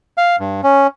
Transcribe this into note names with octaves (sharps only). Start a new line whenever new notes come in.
F5
G2
C#4